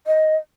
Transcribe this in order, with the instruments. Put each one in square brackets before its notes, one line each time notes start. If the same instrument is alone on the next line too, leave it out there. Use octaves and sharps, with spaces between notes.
[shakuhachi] D#5